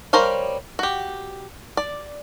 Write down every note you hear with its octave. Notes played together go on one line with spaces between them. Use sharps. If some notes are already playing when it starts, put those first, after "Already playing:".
G3 A#4 C5 C#5 F5
F#4 G4
D5